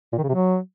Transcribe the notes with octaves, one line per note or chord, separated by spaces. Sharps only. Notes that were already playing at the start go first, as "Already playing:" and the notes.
A#2
D#3
C#3
C3
F#3